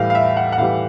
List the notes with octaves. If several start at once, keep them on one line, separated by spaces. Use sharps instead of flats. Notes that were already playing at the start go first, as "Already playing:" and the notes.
Already playing: A2 E3 G3 F5
F5
E5
F#5
F#5
A2 E3 G3 F5